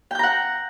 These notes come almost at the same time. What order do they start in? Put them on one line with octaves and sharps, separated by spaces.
G5 G6 A#5 F#5